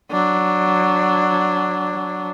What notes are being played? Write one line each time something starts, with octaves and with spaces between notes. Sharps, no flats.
F#3 D4